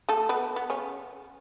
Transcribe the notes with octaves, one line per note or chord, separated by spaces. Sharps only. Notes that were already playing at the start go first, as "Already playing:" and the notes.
A3 A4
B3 B4
B3
C#3 C#4